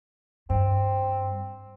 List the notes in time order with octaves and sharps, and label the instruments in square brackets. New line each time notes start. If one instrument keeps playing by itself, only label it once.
[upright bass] G2 [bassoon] C4